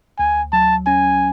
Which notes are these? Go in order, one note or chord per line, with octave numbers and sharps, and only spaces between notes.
D2 G#5
F#3 A5
C#4 G#5